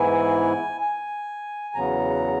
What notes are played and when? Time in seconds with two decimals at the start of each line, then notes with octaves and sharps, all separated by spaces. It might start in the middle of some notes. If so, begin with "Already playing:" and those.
Already playing: G#2 E3 B3 E4 G#5
0.81 G#5
1.75 E2 C#3 F#3 B3 A#5